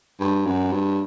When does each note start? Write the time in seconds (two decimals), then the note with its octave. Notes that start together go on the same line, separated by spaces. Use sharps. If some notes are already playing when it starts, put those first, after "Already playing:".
0.20 G2
0.46 F#2
0.72 G2